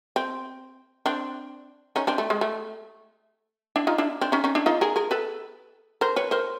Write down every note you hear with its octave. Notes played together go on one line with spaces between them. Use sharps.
C4
C4 D4
C#4 D#4
C4 D4
A3
G#3
A3
D4 E4
D#4 F4
D4 E4
C4 D4
C#4 D#4
C#4 D#4
D4 E4
D#4 F4
G#4 A#4
G#4 A#4
A4 B4
A#4 C5
B4 C#5
A#4 C5